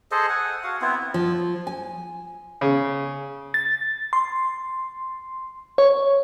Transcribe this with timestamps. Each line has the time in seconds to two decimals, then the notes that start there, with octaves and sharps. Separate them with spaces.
0.12 G#4 A4 C5 D#5
0.30 F#5 G#5
0.64 F#4 F5 F#5
0.81 B3 C4 E4
1.14 F3
1.67 G#5
2.61 C#3
3.54 A6
4.13 C6
5.78 C#5